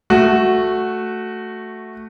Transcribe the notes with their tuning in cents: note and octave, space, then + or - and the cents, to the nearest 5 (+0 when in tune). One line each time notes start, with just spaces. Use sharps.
A3 +0 F#4 +0